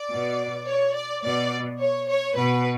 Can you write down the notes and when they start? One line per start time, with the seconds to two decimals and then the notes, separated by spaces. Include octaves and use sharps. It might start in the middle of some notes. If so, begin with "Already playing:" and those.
Already playing: D5
0.11 B2
0.67 C#5
0.95 D5
1.24 B2 D5
1.80 C#5
2.08 C#5
2.36 B2 B4